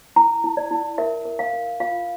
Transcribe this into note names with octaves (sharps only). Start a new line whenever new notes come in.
E4 A#5
E4
D5
E4
A#4 E5
A#4
F5
A#4
F4 F5